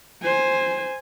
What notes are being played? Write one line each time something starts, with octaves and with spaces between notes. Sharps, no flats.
C5 G#5